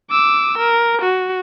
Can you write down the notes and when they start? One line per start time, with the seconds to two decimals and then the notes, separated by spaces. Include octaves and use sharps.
0.11 D6 E6
0.59 A#4
1.02 F#4